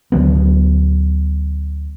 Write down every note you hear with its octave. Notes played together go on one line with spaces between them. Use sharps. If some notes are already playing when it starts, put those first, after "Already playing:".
D2 D3 F#3 B3